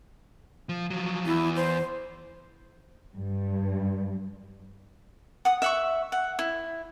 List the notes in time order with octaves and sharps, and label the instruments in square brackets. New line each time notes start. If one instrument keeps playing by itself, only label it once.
[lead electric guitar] F3
F3 F#3
[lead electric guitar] E2 [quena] E4
[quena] C5
[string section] G2
[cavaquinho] F#5 D#6
E5 F#5 C#6
F#5
E4